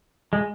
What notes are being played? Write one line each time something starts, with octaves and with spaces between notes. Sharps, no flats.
G#3